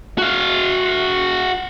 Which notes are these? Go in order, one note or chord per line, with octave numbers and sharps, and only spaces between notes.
F#4 F5